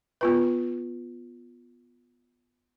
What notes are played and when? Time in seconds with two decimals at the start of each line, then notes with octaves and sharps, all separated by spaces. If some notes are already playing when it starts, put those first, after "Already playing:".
0.21 B3 F4 B4